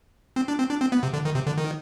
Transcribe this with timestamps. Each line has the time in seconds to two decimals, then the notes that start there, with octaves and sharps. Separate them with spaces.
0.36 C4
0.48 D4
0.59 C4
0.70 D4
0.81 C4
0.92 B3
1.03 C3
1.13 D3
1.25 D#3
1.35 C3
1.47 D3
1.58 D#3